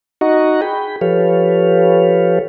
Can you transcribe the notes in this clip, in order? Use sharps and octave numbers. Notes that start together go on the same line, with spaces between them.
D#4 F#4 D#5 F#5 A#5 C#6
G#4 G5 B5
F3 G4 A4 B4 C#5 F5